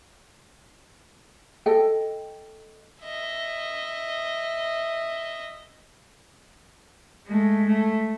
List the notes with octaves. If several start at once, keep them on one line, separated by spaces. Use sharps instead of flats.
A4 D#5 G5
D#5 E5
G#3 A3
A3